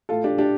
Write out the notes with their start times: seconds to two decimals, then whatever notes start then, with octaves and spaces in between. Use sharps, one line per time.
0.09 A2 A3 F4 A4
0.24 D4 G4
0.38 D4 G4